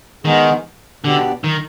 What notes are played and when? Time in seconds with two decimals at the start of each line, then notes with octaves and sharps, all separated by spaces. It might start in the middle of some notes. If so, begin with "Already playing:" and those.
0.25 D#3 G#3 B3 D#4 G#4
1.04 B2 D3 B3 D4 G4 D5
1.44 D#3